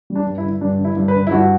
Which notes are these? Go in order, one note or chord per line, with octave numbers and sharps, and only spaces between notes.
G3
D4
G2
E4
D3
G2 D4
D3
E4
G2
B4
D3
E4
G2 F#4